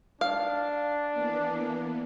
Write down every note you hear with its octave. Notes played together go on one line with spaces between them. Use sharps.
D4 F5
E3 A#3 B3